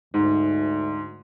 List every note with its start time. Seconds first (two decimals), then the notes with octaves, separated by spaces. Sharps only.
0.14 D2 G#2